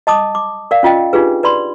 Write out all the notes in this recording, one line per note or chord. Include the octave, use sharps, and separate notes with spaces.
D#5 A5 D6 D#6
D6
A#4 D5 F5
C#4 F4 D#5 G5
D4 D#4 F4 G4 G#4 B4
B4 D5 B5 C6